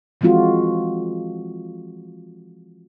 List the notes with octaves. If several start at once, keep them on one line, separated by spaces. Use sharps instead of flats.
E3 F3 G#3 C4 F4 F#4